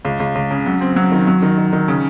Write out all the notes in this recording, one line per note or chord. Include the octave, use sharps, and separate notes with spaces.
C#2
C#2
C#2
C#3
F#3
C4
F#3
D#3
F#3
D#3
D#3
D#3
C#3